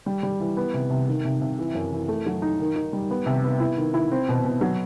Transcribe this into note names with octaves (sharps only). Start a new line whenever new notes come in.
G3
G3
E3
B3
C3
C3
D#3
C3
C3
E3
F#2
E3
A3
F#3
D#4
D#3
D#4
G3
B3
C3
B3
E4
D#3
E4
C4
B2
B2
F#3